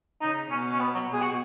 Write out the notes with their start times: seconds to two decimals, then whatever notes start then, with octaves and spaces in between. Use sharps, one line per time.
0.22 C#3 D#4
0.50 B2 C#4
0.71 C#4
0.80 B3
0.95 F#3
1.09 B2 G#4
1.21 F#4